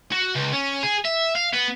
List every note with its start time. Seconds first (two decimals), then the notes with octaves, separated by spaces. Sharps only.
0.12 F#4
0.36 C#2
0.53 C#4
0.83 G#4
1.05 E5
1.35 F5
1.53 B3